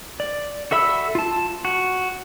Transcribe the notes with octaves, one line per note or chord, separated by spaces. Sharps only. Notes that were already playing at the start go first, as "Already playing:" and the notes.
D5
F#4 A4 E5 B5 E6
F4 A5
F#4